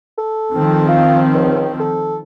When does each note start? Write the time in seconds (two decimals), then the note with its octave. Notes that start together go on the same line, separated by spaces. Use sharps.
0.18 A4
0.54 D#3 F3 C4
0.88 F4
1.34 C#2
1.80 A4